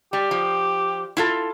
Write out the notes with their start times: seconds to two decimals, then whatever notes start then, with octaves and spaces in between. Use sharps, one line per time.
0.13 G3 G4
0.31 F3
1.17 E4 F4 A4